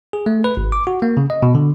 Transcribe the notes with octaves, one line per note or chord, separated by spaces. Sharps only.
G#4
A3
B4
G#1
D6
F#4
A#3
C#3
D#5
B2
D3